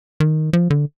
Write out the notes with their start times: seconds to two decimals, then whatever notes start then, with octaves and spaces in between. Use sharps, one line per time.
0.20 D#3
0.53 F3
0.70 D3